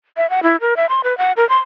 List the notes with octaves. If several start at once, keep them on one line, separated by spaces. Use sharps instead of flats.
E5
F#5
E4
A#4
E5
C6
B4
F#5
A#4
C6